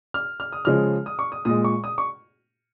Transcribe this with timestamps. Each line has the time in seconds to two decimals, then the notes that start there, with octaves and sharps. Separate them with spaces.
0.14 F6
0.40 F6
0.52 D#6
0.65 C#3 F3 G#3 F6
1.06 D#6
1.19 C#6
1.32 D#6
1.45 A#2 G#3 D#6
1.64 C#6
1.84 D#6
1.98 C#6